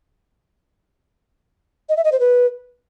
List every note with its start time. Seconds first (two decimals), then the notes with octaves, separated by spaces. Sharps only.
1.89 D#5
1.97 E5
2.04 D#5
2.12 C5
2.20 B4